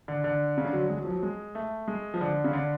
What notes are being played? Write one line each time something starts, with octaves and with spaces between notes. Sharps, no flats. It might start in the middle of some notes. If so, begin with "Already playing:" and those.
D3
D3
C#3
D3
F#3
D3
G#3
F#3
F3
F#3
G#3
A3
G#3
F3
D3
C#3
D3